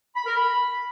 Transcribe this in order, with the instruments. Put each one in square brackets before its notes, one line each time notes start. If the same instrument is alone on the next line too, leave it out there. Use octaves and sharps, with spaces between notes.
[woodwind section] B5
A#4
B5